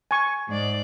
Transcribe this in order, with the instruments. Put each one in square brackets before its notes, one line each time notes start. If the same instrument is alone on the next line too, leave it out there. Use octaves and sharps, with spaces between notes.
[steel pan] G#5 C#6
[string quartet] G#2 D5